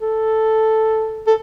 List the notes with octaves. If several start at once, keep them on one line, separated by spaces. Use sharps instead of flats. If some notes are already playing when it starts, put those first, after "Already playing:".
A4
A4